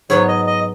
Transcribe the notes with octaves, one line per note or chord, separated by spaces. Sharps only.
G#2 F#3 B3 C#5
D#5
D#5